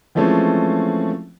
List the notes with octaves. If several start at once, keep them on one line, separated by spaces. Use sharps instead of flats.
E3 F3 G#3 A3 C4 C#4